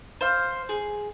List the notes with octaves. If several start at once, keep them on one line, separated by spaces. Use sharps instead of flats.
C5 F5
G#4